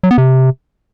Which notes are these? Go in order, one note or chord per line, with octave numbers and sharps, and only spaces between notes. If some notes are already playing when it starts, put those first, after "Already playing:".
F#3
B3
C3